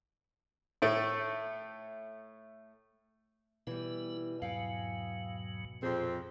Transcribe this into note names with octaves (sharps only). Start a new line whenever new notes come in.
A2 A3
B2 E3 G3 B3 E4
E2 G#2 F#3 F5 G5 G#5
F2 A#2 C4 G#4